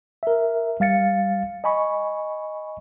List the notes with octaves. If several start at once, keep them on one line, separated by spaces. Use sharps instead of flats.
A#4 E5
G3 F5 A6 C#7
D#5 G#5 B5 C#6